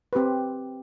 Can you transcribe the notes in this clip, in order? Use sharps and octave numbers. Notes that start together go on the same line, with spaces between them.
C4 G4 B4